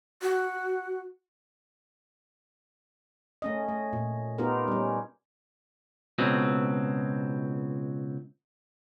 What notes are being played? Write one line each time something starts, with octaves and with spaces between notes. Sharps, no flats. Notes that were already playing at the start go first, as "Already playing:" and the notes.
F#4
A3 C#4 D#5
A3
A#2
B3 D#4 F4 G4 A#4
G3 C#4
C#2 B2 F#3 C4